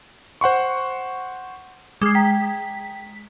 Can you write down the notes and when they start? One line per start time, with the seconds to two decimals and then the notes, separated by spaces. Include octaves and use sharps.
0.41 C5 F#5 C6 C#6
2.02 G#3 D6 F6 C7
2.15 G5 A#5 B6